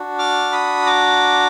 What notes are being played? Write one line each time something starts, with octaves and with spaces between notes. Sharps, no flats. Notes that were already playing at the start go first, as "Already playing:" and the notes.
Already playing: D4 F#4
D6 F6
B5 D#6
A#5 D6